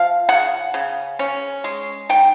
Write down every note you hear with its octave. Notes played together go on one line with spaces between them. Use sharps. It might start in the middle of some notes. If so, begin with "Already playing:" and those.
Already playing: F3 F5
C#3 F#5
C#3
C#4
G#3
D#3 G5